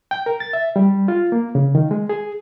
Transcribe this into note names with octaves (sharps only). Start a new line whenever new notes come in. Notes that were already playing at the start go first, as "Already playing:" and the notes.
G5
A#4
A6
E5
G3
F4
A#3
C#3
D#3
G#3
G#4